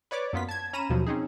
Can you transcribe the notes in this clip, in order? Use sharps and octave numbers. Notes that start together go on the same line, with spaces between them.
B4 C#5 D5 D6
F#2 A#3 B3 F4 B6
A5 G#6
C#4 A#5 B5 D#7 E7
D#2 B2 F3 F#3
C4 C#4 D#4 G#4